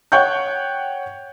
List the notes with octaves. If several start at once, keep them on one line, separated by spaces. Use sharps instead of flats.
C#5 F#5 G5 C#6 G6